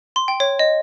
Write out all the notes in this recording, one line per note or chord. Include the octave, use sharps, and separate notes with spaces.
C6
G5
C#5
D#5